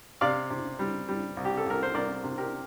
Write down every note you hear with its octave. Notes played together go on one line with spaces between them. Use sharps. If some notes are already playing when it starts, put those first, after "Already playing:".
C3 D5 F5
C3
G3
G3
C2
G4
A4
C2 A#4
C5
C2 A#4 D5
C3
G4 A#4